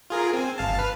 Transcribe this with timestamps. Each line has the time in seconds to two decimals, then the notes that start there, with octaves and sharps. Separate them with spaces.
0.10 F4 G#4 A#4
0.33 C4 G#5
0.58 G1 F5 A5
0.79 B4 F6